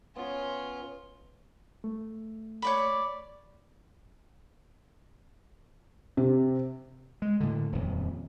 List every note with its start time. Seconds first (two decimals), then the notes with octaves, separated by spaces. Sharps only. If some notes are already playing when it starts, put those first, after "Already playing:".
0.16 B3 C#4 F4
1.84 A3
2.62 C#5 D5 B5
6.17 C3
7.22 G#3
7.40 A2 D3
7.72 D#1 F2